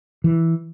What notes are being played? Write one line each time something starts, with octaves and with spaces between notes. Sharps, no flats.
E3